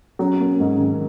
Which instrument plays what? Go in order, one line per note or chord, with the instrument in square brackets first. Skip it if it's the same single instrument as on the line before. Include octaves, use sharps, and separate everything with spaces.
[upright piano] F#3 [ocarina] C#4
[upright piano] A#3
G#2
D#3